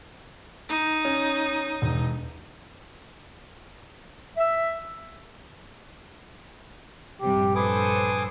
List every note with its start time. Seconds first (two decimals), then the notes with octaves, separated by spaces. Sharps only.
0.69 D#4
1.05 C#4
1.82 E1
4.38 E5
7.21 A#1 G2 C3 G3 G4
7.55 A4 B4 C5 G#5 D6 D#6